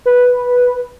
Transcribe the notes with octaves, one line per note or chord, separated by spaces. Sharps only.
B4